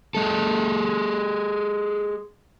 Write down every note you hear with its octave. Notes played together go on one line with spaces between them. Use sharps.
G#3 A4